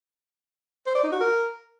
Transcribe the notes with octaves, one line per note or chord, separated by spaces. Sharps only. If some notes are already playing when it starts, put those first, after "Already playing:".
C5
D5
D#4
F#4
A#4